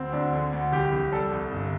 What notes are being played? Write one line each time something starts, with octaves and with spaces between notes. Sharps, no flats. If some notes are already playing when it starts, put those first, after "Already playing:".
Already playing: D2 C4
D2 D4
D3
D2
C2 G4
C2
G3 A4
C2
G1